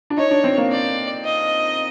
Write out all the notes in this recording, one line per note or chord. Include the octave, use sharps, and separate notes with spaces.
D4
D#4 C#5
D4
C4
A#3
D5
D#5